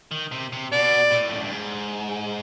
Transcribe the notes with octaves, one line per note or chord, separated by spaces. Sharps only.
D#3
C3
C3
B2 D5
A2
F2
F#2
G2
G#2